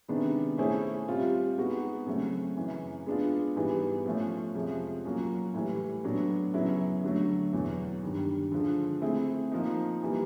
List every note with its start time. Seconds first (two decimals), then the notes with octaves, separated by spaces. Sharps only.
0.08 C3 D#3 G#3 B3 D4
0.58 A3 C#4 E4 G#4 C5
1.08 G3 C4 F4
1.57 G#3 B3 D#4 F#4
2.06 C#3 F#3 A3 C4
2.57 F#2 C#3 E3
3.06 G#3 B3 D4 F4
3.56 G#2 E3 G3 B3
4.05 F3 A3 C#4
4.55 F2 C3 F3 G#3 C#4
5.05 F#3 A#3 C#4 F4
5.54 A2 E3 G3
6.04 A2 F#3 B3 D4
6.54 F#2 C#3 F#3 B3 E4
7.03 D3 F#3 A3
7.53 E2 B2 F#3
8.03 G2 D#3 G3
8.52 D3 F3 G#3
9.01 A3 C4 E4 G#4
9.52 F3 A#3 D#4
10.03 E3 G3 A#3